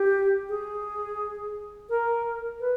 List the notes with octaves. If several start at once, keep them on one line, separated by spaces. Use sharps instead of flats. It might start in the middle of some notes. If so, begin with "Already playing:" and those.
Already playing: G4
G#4
A#4
B4